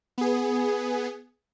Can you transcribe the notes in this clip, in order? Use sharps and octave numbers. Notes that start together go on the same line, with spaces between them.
B3 G#4